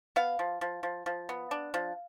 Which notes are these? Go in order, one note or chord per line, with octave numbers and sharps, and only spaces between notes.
B3 F5
F3
F3
F3
F3
B3
D4
F3